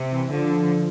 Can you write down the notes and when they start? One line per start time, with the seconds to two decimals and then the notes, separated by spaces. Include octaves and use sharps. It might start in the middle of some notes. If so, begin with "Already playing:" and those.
Already playing: C3
0.12 E3
0.33 D3 F3